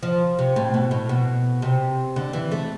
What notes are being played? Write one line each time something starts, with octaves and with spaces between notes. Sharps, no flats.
F3
C3
A2
B2
A2
B2
C3
D3
E3
A3